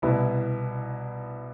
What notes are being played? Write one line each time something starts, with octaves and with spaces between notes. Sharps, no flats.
C2 B2 B3 E4